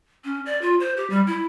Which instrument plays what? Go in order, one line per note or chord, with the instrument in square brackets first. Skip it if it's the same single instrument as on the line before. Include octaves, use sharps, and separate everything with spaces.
[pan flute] C#4
D5
F4
C5
G4
G3
E4